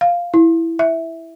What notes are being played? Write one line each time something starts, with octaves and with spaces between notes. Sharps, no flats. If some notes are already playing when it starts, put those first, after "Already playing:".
F5
E4
E5